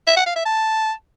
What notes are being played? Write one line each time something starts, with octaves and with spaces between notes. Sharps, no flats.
E5
F#5
F5
E5
A5